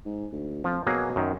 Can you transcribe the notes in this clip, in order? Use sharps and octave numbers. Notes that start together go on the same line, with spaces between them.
G#2
D2
F2 F3
B2 F#3 A#3 G#4
F#2 D#3